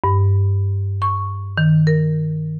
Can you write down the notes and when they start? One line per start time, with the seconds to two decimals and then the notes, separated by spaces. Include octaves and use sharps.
0.04 G2
1.02 C#6
1.58 D#3
1.87 A#4